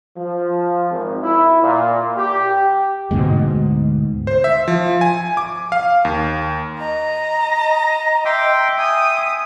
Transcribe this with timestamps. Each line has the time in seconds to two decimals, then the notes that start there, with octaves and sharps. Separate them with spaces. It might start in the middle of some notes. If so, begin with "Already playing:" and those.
0.17 F3
0.91 G#1
1.23 E4
1.63 A#2
2.17 G4
3.11 D2 G#2 B2 G#3
4.27 C5
4.44 E5
4.68 F3
5.01 G#5
5.37 D6
5.72 F5
6.05 D#2
6.80 D#5 A#5
8.25 E5 G5 C6 D6
8.78 G5 G#5 D#6